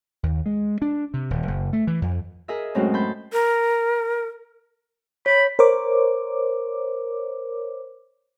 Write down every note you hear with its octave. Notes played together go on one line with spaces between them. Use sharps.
D#2
G#3
D4
C3
D#1
F#1
A3
E3
F2
G#4 A#4 D#5 E5
F#2 A2 G#3 C4 C#4 F#4
A5 B5 C6 G6
A#4
C#5 B5
A#4 C5 C#5 D6